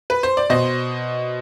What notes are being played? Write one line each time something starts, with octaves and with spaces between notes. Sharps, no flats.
B4
C5
D5
B2 C5 D#5